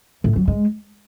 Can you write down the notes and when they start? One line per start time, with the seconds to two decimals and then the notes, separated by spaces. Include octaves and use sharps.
0.24 A2
0.36 F#3
0.48 G#3